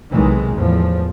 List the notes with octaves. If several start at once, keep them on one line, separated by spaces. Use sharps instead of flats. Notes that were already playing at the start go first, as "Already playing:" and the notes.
B1 C3 D#3 E3 G#3
E2 A2 F3